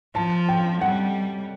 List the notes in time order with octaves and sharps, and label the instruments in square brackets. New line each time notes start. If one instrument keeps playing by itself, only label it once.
[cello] F3 [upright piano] A5
[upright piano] G5
[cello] G3 [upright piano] F#5